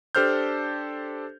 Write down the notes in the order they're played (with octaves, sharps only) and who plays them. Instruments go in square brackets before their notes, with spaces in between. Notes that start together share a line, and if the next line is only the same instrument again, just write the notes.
[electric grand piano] D4 G4 A4 C5 F6 G6